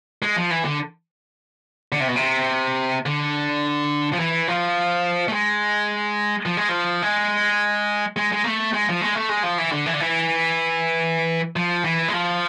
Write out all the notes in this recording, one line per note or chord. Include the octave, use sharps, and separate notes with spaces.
G#3
F3
E3
D3
D3
C3
B2
C3
D3
F3
E3
F3
A3
G#3
F3
G#3
F3
G#3
G#3
G#3
A3
G#3
F3
G#3
A3
G#3
F3
E3
D3
E3
D3
E3
F3
E3
G#3
F3